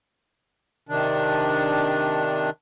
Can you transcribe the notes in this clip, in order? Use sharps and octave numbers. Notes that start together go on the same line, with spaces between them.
C3 D#3 D4